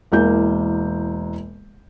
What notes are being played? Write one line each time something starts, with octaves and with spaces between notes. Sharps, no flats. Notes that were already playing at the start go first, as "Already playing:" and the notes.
E1 E3 A#3 G6